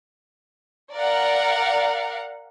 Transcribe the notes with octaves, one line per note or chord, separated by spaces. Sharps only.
A#4 D5 F5 F#5